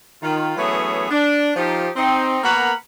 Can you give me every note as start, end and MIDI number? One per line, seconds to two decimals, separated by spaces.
0.22 0.55 51
0.22 0.55 65
0.57 1.08 52
0.57 1.08 54
0.57 1.08 57
0.57 1.08 59
0.57 1.08 61
0.57 1.08 68
1.11 1.51 62
1.56 1.89 53
1.56 1.89 63
1.56 1.89 67
1.96 2.38 60
1.96 2.38 63
2.43 2.72 58
2.43 2.72 59
2.43 2.72 70
2.43 2.72 78
2.43 2.72 82
2.43 2.72 83